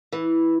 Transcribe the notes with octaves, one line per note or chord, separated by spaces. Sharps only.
E3